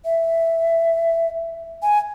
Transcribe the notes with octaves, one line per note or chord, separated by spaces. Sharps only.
E5
G#5